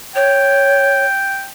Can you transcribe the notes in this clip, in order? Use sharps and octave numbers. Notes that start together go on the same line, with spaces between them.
C#5 G5